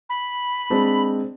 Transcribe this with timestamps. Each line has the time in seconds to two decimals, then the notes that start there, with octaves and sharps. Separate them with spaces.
0.10 B5
0.70 G#3 C4 D4